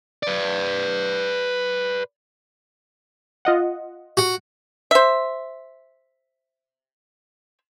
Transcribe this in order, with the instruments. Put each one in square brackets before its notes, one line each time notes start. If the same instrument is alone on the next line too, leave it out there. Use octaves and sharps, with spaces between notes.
[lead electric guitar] B4 D5
[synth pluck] F4 D#5 F#5
[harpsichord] F#4
[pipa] C5 E5